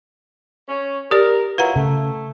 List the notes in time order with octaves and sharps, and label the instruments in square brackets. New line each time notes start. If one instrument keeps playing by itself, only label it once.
[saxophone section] C#4
[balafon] G4 D5 [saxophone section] A#4
[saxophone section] F#3 E4 F4 [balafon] B4 F#5 A#5
[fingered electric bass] C#3 [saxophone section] A3